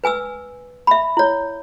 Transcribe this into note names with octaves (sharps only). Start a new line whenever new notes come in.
B4 G#5 D#6 E6
E5 B5
E4 C#5